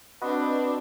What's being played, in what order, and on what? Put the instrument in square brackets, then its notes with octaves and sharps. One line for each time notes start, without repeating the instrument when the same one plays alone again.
[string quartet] C4 D4 D5 [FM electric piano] F#4 B4 D#5